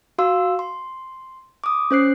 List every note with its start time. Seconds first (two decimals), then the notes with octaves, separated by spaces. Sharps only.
0.18 F#4 F5 C6 E6
0.59 C6
1.64 D6 D#6
1.91 C#4 C5 F#6 C7